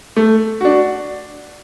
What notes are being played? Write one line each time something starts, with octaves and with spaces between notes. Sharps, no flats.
A3
D4 F#4